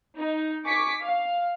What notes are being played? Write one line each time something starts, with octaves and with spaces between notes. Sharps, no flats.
D#4
G#5 C#6 D6 B6 C#7
F5